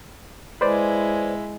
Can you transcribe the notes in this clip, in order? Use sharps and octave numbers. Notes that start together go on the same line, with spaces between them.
G#3 E4 B4 C5 D5